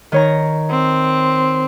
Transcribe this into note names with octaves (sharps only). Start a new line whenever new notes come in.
D#3 C#5 A#5
C4